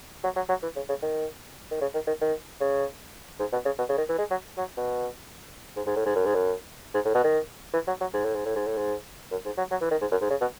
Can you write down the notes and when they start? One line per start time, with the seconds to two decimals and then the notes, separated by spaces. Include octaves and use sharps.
0.24 F#3
0.36 F#3
0.49 F#3
0.63 E3
0.76 C#3
0.89 C#3
1.02 D#3
1.71 D#3
1.81 C#3
1.94 D#3
2.07 D#3
2.22 D#3
2.61 C#3
3.40 G#2
3.53 B2
3.65 C#3
3.79 B2
3.89 C#3
3.98 D#3
4.09 E3
4.18 G#3
4.31 F#3
4.58 F#3
4.77 B2
5.77 G#2
5.87 G#2
5.96 A2
6.06 G#2
6.16 F#2
6.26 G#2
6.35 F#2
6.94 G#2
7.05 A2
7.15 B2
7.24 D#3
7.74 E3
7.88 F#3
8.01 F#3
8.14 G#2
8.25 A2
8.35 G#2
8.46 A2
8.56 G#2
8.67 A2
8.78 G#2
9.32 F#2
9.46 G#2
9.58 F#3
9.71 F#3
9.81 E3
9.91 D#3
10.01 G#2
10.12 F#2
10.21 G#2
10.30 C#3
10.41 B2